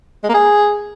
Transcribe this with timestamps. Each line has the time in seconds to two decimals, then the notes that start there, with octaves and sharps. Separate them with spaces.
0.24 G#3
0.29 A#3
0.34 G#4